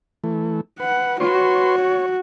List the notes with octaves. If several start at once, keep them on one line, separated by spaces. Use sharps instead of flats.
E3 A3
B4 F#5
F#4 B4 C#5 C6
C#5